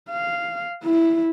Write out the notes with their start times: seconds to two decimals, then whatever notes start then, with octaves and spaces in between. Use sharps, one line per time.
0.11 F5
0.83 E4